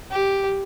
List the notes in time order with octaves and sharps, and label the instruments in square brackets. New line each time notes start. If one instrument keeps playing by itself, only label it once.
[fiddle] G4